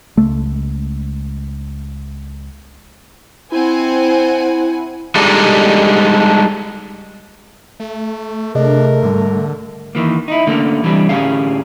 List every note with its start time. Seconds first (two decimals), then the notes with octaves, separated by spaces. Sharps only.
0.17 C#2 A3
3.52 C4 E4 F#5 G#5
5.15 G3 G#3 D4 D#4 A4
7.80 A3
8.55 C3 A3 D4 G#4 A#4 D#5
9.03 G#2 D3 G3
9.95 D#3 E3 A#3
10.28 D#4 E4
10.47 D3 A3 A#3 C#4 D4
10.84 E3 G3 C4 D4
11.09 A2 D3 C#4 G4 G#4 F5